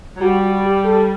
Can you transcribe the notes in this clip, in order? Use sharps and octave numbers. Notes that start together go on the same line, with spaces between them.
F#3
G3 F#4
F#4
G4
A4